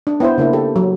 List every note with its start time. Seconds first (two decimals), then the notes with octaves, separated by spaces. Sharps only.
0.07 D4
0.20 B3 E4 C5
0.38 C#3 A#3 D4 E4
0.53 G4 A4
0.76 F#3